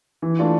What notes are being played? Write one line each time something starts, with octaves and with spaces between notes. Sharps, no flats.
E3
A3 D4 F4